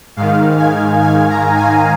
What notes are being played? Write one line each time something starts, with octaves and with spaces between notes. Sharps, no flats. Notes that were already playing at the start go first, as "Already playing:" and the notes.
G#2 D#3 F5
G#5
G#5
A#5
G#5